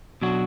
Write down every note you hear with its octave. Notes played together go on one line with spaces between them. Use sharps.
B2 F#3 D4 F#4